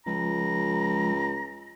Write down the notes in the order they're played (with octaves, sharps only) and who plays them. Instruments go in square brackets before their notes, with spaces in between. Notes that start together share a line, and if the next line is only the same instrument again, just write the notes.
[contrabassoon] C#2 [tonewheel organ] F3 G#3 [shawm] A#5